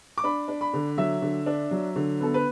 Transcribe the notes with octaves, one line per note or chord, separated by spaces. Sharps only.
D6
D4 B5
D4
B5
D3
F#3 E5
D3
D4
F#3
D3
B3 A4
B4